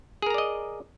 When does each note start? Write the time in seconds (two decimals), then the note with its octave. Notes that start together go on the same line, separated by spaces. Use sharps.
0.22 G#4
0.26 A#4
0.30 A#5
0.34 D5
0.38 D#5